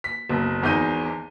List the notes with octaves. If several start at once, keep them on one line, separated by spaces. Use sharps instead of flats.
B6
F#1 B1
G#1 E2 D#4 G6 D#7